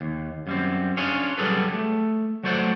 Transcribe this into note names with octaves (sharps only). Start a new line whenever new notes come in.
D#2
F#2 G3 C4
C#4 D4 F4 G#4 C#5
F#3 G3 G#4 A4 B4
A3
F#3 A3 F#4 C5 D5 F#5